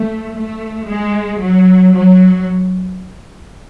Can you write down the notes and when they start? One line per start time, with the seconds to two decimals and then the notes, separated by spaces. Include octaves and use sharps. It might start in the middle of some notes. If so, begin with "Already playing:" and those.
Already playing: A3
0.32 A3
0.85 G#3
1.38 F#3
1.92 F#3